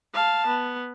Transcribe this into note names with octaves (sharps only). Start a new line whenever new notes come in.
F5 A5
B3